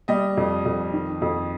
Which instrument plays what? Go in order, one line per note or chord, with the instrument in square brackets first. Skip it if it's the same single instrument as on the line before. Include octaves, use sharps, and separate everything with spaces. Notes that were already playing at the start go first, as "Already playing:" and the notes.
[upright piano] G3 D#5
F2
F2
D#3
F2